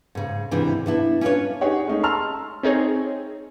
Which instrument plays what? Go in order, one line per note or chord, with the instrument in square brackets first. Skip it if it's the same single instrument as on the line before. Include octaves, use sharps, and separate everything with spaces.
[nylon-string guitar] G#2 C#3
D2 G#2 C3 E3 D4
B3 D4 E4
C#4 D4 F4 G4 B4 C#5
[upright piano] D#4 G4 G#4 C#5 F#5
G#3 A3 C#4 D#4
A5 A#5 C6 E6 F6 F7
[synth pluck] C4 D#4 G#4 C#5